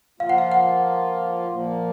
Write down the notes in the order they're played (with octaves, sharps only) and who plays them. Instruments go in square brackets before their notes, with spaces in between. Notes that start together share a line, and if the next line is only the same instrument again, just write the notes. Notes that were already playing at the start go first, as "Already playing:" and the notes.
[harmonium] F3 A#3 F4 [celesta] F5
[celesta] F#5
F5
F#5
[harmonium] A#2 F3 A#3